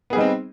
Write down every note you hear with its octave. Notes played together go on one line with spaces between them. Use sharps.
G3 B3 C4 D#4 G#4